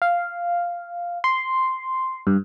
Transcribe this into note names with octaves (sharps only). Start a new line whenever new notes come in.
F5
C6
G2